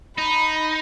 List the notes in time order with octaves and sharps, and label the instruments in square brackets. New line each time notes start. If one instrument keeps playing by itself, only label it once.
[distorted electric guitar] D#4 [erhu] B5